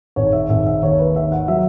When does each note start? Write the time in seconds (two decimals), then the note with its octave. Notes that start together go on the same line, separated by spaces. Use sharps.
0.16 G#1 C#5
0.33 E5
0.50 G#1 E5
0.66 E5
0.82 D#2 C#5
0.99 B4
1.15 D#3 E5
1.32 F#5
1.48 F#3 E5